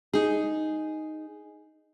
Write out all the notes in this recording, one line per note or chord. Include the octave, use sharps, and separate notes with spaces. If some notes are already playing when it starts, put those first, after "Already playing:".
D#4 G#4